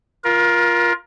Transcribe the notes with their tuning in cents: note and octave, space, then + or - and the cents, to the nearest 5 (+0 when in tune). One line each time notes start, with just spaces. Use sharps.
F4 +0 A#4 +25